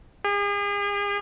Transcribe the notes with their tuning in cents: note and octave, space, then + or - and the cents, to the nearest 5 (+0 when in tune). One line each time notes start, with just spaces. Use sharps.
G#4 -40